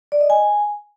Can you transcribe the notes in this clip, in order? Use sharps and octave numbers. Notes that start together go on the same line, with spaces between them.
D5
D#5
G#5